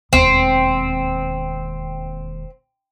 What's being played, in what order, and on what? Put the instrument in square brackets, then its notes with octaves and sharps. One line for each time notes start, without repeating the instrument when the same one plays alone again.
[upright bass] E1 D#2 [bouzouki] C4